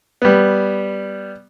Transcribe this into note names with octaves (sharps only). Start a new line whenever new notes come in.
G3 B3